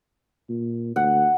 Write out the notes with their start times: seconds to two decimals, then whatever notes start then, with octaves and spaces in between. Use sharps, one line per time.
0.49 A#2
0.96 D2 F#5